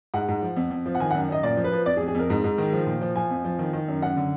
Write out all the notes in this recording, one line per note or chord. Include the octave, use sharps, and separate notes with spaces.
G#2 F#5
G#2
F3
F2
F2
F3
F#5
D#3 G#5
F#5
F#2
F#2 D#5
A#2 D5
F3
B4
F3
F2 D5
G#4
F2
G#4
F2 A#4
G#2
G#2
D#3
F3
A#2
F3
F3 G#5
F2
F3
D#3
D#3
F#2
F#2 F#5
D3